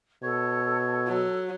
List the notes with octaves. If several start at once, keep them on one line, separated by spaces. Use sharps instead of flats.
B2 A4 C#5
F#3